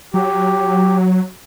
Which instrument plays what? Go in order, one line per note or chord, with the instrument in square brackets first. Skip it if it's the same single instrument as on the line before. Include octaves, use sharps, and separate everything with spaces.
[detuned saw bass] F#3 [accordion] G4